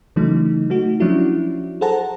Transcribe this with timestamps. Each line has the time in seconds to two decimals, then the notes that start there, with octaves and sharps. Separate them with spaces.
0.16 C#3 E3 F#3 A3 D#4
0.70 A3 D#4 F#4
1.00 F3 F#3 C#4 D4 E4 F#4
1.81 G#4 A4 C5 F#5 A5 A#5